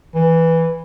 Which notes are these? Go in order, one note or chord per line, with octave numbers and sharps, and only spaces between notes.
E3